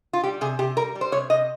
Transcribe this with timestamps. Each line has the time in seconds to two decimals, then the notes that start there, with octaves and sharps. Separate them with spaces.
0.13 F4
0.23 G3 G4
0.41 C3 G#4
0.59 C3 G4
0.77 G3 A#4
0.95 G3
1.01 C5
1.12 C3 C#5
1.30 C3 D#5